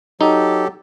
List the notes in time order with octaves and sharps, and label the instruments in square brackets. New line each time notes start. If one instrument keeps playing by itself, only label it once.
[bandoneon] F#3 G4 A4 [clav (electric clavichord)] D#4